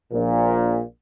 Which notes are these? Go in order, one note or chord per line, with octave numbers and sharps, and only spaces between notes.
A#1 A#2